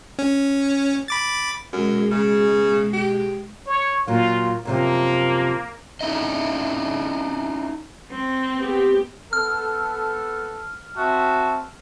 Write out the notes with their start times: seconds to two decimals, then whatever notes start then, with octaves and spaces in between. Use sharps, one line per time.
0.19 C#4
1.08 B5 D6 A6
1.73 F#2 B2 G#3
2.11 C#3
2.93 G4
3.66 C#5
4.07 A#2 F#3 F4
4.65 F#2 C3 F3 A#3
6.01 C#4 D#4 E4 D#5
8.11 C4
8.57 B3 G4
9.33 B3 A4 F6
10.97 C4 F#4 E5 A5